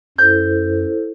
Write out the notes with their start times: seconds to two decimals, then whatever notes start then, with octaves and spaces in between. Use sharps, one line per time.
0.18 F#2 E4 A4 C5 G6